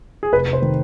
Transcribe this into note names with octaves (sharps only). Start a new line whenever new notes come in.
G#4
F1 B4
F1
C5
D#3